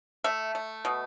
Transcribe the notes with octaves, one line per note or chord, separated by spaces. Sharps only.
A3 E5
A3
B2